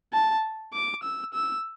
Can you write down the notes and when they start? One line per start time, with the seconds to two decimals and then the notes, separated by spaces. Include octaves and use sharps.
0.13 A5
0.73 D6
1.03 E6
1.34 E6